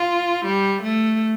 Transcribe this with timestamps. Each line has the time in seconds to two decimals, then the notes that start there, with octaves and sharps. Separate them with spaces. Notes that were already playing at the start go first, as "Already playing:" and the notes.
Already playing: F4
0.45 G3
0.82 A3